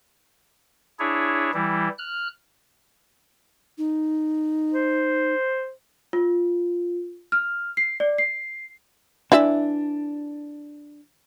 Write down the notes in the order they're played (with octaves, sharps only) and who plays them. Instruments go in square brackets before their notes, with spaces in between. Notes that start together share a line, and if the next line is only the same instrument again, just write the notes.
[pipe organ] D4 E4 G#4 C#5
E3 G3 E4
F6 F#6
[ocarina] D#4
[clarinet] C5
[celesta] F4
F6
C7
D5
C7
[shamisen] E3 D5 E5 [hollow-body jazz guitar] D4